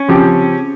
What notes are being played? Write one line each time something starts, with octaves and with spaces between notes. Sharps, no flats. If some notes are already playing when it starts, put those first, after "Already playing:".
Already playing: C#4
C#3 F3 C4 G4